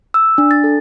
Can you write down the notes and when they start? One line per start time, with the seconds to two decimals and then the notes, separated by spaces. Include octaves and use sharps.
0.14 E6
0.38 D4
0.51 A6
0.64 A4